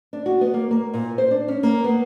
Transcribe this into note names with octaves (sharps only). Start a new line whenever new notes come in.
D4
F#4
B3
A#3
A#3
A#2
C5
D4
C#4
A#3
B3